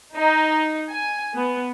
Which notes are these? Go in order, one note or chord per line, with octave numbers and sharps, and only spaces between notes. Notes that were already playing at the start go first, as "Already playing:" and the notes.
D#4
G#5
B3